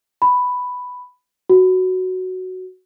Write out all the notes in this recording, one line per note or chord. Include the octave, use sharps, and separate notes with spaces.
B5
F#4